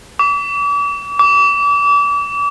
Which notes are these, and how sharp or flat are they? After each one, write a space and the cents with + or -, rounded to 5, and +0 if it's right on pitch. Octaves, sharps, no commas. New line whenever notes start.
D6 -40
D6 -35